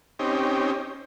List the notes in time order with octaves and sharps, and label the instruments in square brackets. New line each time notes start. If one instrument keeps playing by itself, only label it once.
[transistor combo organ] C4 C#4 D#4 G4